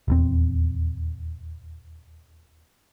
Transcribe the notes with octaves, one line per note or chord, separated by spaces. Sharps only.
D#1 E2 C4